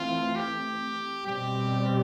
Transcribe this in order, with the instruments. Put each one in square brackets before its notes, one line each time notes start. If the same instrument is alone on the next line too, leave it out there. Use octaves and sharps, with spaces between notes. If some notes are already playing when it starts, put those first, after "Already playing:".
Already playing: [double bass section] E3 A3 C4 [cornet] F4
[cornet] G4
[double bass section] B2 G3 C4 [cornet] G4